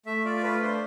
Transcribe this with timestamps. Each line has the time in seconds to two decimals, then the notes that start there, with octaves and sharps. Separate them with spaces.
0.06 A3 E5
0.25 F4 D5
0.43 A3 B4
0.62 D4 C5